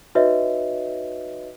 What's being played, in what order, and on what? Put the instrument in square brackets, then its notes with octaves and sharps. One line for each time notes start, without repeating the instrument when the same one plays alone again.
[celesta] D#4 F#4 B4 C#5 D#5 E5